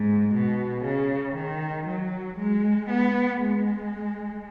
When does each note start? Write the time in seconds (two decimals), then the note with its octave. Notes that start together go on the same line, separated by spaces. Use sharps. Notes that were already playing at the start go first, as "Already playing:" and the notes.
Already playing: G#2
0.33 B2
0.84 C#3
1.36 D#3
1.87 F#3
2.38 G#3
2.89 B3
3.41 G#3